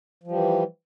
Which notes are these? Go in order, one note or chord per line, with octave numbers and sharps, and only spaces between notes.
E3 F3 G3